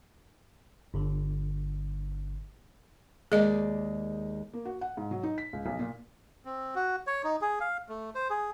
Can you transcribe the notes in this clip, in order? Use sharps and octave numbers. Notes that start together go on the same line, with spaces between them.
G1 D3
D#2 G#3 G#4 D5 D#5
A#3
F#4
F#5
G#2
F#3
D#4
B6
C#2
B1
A#2
C4
F#4
C#5
D#4
G#4
F5
A3
C5
G#4